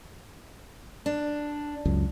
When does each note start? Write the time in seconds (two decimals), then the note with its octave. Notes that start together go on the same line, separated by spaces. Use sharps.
1.06 D4
1.85 C#2 F#2